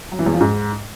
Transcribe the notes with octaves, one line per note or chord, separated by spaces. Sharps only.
F#3
E3
E2
F3
G#2